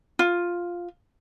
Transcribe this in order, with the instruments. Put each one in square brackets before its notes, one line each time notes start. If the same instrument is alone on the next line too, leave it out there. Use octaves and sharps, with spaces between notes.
[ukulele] F4